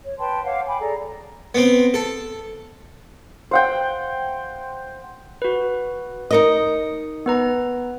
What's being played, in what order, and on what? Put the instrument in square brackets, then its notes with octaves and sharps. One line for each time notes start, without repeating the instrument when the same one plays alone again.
[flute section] C#5
B4 G5 A5 C6
C#5 F5 F#5 D6
G5 G#5 B5 D6
G#4 A4 D5 A#5
[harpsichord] B3 C4
A4
[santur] C5 F#5 G5
[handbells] F#4 B4
[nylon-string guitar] D#4 A#4 D#5 [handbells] D#6 C#7
[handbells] B3 B4 A#5